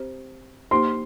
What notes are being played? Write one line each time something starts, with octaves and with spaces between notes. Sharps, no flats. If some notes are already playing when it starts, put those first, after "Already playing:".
Already playing: C4 G4 C5
A#3 D#4 G4 C5 C6